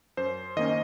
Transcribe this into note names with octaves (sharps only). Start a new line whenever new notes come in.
F#2 C5
D#3 A#3 C#4 D#5